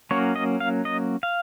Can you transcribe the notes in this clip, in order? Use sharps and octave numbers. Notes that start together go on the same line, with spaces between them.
F#3 A#3 C#4 C#5
D#5
F5
D#5
F5